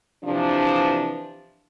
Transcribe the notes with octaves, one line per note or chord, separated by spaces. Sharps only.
C3 E3 F3 D4